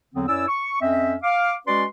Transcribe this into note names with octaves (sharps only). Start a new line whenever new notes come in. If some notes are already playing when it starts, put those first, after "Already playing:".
E2 D3 F#3 B3 C4
F#2 C#4 E4 C#5 D5 E6
C#6
F2 C4 C#4 D#5 E5
F5 D6
G#3 C#4 F#4 B4 D5 C6